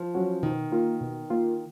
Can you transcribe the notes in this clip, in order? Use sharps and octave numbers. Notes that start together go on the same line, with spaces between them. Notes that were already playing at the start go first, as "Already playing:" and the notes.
Already playing: F3
F#3 C#4 F#4
B2 D#3
A#3 F4
B2
A#3 F4